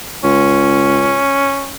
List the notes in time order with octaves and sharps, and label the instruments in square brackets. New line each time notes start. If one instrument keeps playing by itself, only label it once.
[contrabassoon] C#2 [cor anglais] C#4